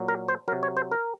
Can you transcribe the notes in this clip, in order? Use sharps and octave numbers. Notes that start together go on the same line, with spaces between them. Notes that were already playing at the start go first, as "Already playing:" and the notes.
Already playing: A#2 F#3
A#4
C5
C3 F#3 A#4
C#5
C5
A#4